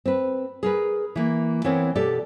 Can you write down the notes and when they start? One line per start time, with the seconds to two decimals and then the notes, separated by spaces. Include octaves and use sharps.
0.06 C4 B4
0.63 G#4 A#4 B4
1.16 E3 A#3
1.64 E3 B3 C4 A#4 C#5
1.95 B2 G4 A4 D5